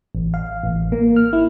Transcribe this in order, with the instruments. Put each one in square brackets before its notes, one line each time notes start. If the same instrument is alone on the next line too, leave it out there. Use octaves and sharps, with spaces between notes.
[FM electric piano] A1
F5
A1
A#3
F6
E4